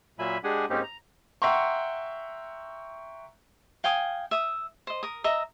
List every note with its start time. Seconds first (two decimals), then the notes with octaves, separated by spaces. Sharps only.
0.19 A#2 F#3 A#3 E5 G#5 B5
0.44 G#3 D4 G4 G#4 F#5 G#5
0.70 G#2 A#3 C4 C#4 D#4 G4
0.83 A#5
1.42 E5 F#5 G5 A#5 C6 C#6
3.84 F5 G5 G#5 D#6
4.31 E5 D#6
4.87 C5 D#5
5.03 A#4 D#6
5.24 D#5 E5 A#5